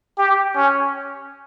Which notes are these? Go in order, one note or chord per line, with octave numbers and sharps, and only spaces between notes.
G4
C#4